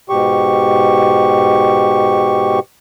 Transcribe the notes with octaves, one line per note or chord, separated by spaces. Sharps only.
G#2 B2 G4 C#6